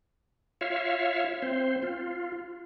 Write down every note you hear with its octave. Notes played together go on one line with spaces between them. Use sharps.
F4 C#5 E5 F5
C4 C5
F4